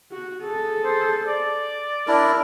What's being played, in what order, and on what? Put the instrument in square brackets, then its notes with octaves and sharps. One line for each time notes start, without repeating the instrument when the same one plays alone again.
[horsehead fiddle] F#4
G#4 A4
[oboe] C5
D5
[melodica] D4 E4 [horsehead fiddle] A#4